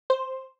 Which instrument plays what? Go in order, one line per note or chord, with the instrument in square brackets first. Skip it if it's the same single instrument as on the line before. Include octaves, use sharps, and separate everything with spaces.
[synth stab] C5